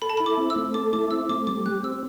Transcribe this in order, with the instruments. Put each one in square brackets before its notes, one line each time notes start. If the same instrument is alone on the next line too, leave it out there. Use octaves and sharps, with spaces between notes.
[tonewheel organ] A4 [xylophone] B5
[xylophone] A5
[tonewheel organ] E4 [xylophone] B5
[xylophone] D6
[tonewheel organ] C4
[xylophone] E6
[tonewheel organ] A3
[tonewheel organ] A4 [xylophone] D6
[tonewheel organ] E4 [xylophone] D6
[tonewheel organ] C4 [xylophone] E6
[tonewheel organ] A3 [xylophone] D6
[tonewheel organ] G3 [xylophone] D6
[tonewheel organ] G4 [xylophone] F#6
[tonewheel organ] C4 [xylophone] E6